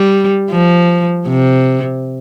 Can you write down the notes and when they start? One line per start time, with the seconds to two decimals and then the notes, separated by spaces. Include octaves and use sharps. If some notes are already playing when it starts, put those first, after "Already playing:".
Already playing: G3
0.51 F3
1.27 C3